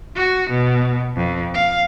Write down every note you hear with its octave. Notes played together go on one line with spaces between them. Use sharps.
F#4
B2
F2
F5